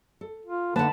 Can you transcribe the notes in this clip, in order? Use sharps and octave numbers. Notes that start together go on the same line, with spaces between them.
A4
F4
D3 A#3 D#4 B4 F#5 A5